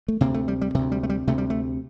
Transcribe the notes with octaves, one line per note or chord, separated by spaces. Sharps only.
A3
D2 C3 A#3
A3
G3
G3
D2 C3 E3
G3
A3
G3
D2 C3 A3
G3
A3